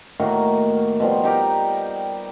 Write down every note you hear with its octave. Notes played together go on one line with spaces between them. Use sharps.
A2 D#3 A#3 F#4
B2 F3 G3
D#4 G4 A#4